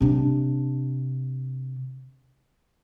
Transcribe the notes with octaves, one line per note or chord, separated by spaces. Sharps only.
C3 D4